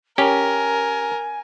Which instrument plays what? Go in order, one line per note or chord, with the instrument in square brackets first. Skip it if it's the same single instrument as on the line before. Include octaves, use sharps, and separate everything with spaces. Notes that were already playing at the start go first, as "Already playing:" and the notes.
[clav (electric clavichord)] C#4 G4 [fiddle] A#4 [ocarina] G#5